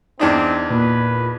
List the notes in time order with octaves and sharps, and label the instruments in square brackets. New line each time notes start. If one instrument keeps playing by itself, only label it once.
[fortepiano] E2 D4 D#4 [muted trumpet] C4
[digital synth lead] A#2 [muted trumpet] B4